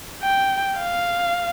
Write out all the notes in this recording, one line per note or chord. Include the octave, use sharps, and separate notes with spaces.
G5
F5